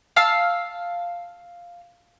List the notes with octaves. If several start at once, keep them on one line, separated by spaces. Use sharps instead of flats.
F5 A5 E6 F6